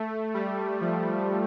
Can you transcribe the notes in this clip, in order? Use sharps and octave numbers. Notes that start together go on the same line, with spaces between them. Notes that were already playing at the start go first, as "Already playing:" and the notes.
Already playing: A3
G3
F3